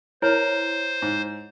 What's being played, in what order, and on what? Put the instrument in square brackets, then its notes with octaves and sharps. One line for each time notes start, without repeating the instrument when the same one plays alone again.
[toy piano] E4 C#5 [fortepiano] A#4 [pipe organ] C5
[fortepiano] G#2